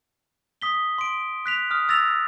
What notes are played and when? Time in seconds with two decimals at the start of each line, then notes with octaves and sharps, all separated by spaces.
0.62 D#6 B6 G7
0.98 C6 D7
1.46 F#6 B6 F7
1.71 D#6 F6
1.89 E6 A6 A#6 F7